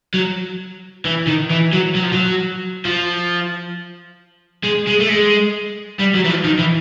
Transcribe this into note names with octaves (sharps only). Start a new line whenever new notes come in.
F#3
E3
D#3
E3
F#3
F#3
F3
F#3
F3
G#3
G#3
A3
G#3
G3
F#3
E3
F3
D#3
E3